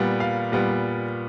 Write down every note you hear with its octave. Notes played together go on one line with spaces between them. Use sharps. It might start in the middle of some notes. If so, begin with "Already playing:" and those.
Already playing: A#2 G3 B3
F5
A#2 G3 B3